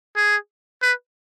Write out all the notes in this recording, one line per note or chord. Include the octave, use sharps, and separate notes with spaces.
G#4
B4